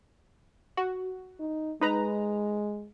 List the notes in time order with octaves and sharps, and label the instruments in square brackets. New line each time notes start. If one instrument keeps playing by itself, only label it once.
[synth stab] F#4
[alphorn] D#4
[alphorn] G#3 [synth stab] D#4 B4 A#5